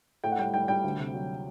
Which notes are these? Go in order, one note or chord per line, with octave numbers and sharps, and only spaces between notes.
A2 G5
F#5
G3 G5
G3 G5
G3 G5
D2
C3
F#3